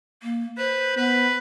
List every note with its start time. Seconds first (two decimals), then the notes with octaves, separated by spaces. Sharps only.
0.23 A#3
0.58 B4 C5
0.97 B3 B4